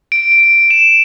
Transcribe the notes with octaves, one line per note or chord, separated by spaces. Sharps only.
D7
D7
E7